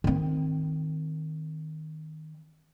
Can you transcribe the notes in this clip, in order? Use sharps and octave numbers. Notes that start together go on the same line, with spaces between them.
D#3 C4